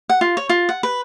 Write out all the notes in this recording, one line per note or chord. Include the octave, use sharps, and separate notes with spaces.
F#5
F4
C#5
F4
F#5
B4